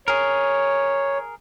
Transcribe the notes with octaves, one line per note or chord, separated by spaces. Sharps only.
G#4 A#4 C#5